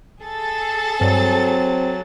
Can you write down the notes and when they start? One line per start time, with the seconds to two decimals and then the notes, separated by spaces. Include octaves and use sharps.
0.23 G#4 A4 A6
1.01 G2 F#3 C4